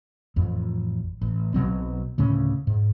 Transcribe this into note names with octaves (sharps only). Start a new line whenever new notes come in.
A1 F2
A1
B1 B2 F#3 C4
D2 A2 C#3 C#4
G#2